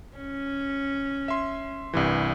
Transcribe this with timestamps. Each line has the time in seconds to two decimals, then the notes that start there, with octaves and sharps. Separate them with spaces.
0.17 C#4
1.28 E5 C6
1.93 C2 G2 E3